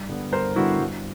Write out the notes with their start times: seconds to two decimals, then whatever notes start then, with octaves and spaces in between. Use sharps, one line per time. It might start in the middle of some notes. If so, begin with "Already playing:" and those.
Already playing: G2
0.09 D3 G3 B3
0.32 G2 A#4 C5
0.56 D3 G3 B3 E4 F#4
0.80 G2